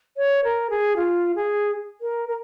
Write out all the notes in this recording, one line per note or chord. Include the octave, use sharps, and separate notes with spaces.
C#5
A#4
G#4
F4
G#4
A#4
A#4